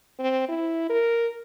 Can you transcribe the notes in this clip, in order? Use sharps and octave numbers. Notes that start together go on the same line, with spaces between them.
C4
E4
A#4